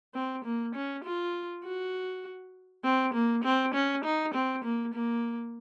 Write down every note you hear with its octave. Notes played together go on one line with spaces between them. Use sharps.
C4
A#3
C#4
F4
F#4
C4
A#3
C4
C#4
D#4
C4
A#3
A#3